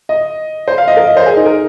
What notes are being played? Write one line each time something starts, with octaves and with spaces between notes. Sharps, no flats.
D#5
C5
F5
D#5
A#4
D#5
C5
G#4
D#4
A#4